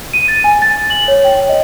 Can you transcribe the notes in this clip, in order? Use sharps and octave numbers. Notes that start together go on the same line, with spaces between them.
D#7
A6
G#5
A6
F#7
C#5
G5
D#5